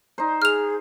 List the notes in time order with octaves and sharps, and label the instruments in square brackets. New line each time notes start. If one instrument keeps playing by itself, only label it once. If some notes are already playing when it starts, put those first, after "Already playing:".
[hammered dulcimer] D#4 C5
[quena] G#4 [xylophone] F6 F7